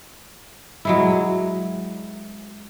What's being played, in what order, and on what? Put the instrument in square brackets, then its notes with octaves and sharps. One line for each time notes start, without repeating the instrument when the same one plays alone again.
[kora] F#3 G#3 E4